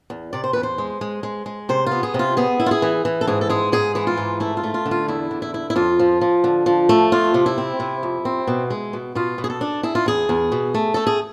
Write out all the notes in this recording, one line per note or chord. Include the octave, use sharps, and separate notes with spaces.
E2
C3 D5
C5
E2 B4
C5
G#3
G#3
G#3
G#3
C3 C5
B3 F4
G#4
C3
F4
B3 G#4
E4
F4
G#4
E3
E3
A4
G#2 G#4
A4
G#3 G#4
G#2 G#4
E3 G#4
F4
G#2
A3 E4
F4
A3
F4
D3
F4
E2 E4
D3
E4
E4
E4
F2 F4
F3
F3
D3
F3
A3
F2 F4
C3
E4
C4
C3
F2
C4
B2
G#3
B2
B2 F4
B2
G#4
A4
D4
E4 G#4
F4
E2 G#4
E2
B2
A3
A3 A4
G#4